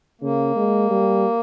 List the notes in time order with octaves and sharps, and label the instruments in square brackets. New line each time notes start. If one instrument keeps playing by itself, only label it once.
[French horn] C#3 [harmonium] A#3
[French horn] G#3
G3